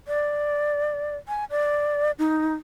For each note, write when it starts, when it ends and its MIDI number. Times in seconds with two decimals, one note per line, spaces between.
0.08 1.16 74
1.28 1.45 80
1.50 2.11 74
2.19 2.55 63